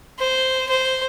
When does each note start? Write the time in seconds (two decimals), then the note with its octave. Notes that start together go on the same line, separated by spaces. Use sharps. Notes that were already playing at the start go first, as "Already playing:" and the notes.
0.19 C5
0.69 C5